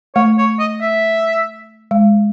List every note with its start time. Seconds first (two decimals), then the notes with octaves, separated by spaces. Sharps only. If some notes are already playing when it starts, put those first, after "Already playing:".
0.15 A3 C#5
0.38 C#5
0.59 D#5
0.81 E5
1.91 G#3